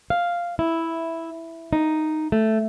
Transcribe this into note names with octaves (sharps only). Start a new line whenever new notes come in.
F5
E4
D#4
A3